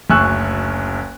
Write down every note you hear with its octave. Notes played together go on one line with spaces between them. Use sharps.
F#1 D2 G#5 C#6 E6 F#6